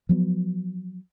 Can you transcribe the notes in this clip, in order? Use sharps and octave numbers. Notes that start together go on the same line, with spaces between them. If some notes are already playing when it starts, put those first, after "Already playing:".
F3 F#3 B3